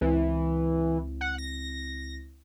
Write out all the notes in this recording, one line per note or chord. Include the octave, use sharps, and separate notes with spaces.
C#2 E3 C4 E4
F#5
A#6